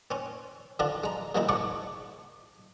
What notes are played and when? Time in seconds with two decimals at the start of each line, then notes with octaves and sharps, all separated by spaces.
0.11 C4 C#4
0.79 D3 C4 D4 F4
1.04 G#3 A#5
1.35 A#2 C#3 G#3 C4 D#4 E4
1.49 G#2 D4 D5 C#6